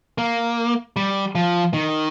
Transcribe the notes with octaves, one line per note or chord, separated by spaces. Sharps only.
A#3
G3
F3
D#3